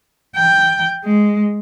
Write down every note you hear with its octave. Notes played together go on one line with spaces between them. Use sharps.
G5
G#3